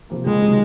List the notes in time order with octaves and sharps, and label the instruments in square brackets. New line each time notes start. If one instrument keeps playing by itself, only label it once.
[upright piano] C3 F3 A#3
[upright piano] C#2 [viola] G#3
[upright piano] C3 D#3 F#3